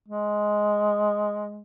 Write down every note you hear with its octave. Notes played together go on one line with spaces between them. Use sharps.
G#3